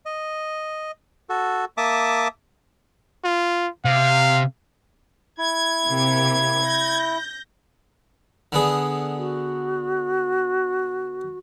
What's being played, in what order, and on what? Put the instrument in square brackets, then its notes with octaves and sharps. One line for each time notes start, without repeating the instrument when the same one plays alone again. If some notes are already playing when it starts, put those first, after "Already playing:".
[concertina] D#5
F#4 A4
A#3 E5 A5 D6 D#6
[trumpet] F4
[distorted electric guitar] C3 [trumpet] F5
[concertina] E4 [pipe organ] G#6
[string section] C3 A#3 G4
G6 A#6
[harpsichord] D3 B3 G#4
[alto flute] F#4